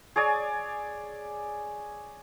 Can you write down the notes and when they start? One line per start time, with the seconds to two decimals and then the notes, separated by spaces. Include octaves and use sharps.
0.16 G#4 C#5 D5 G#5